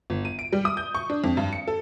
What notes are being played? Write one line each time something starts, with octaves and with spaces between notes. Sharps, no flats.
G1
D#7
D7
G3
D#6
G6
C#6
D4
F2
G2
C#7
A4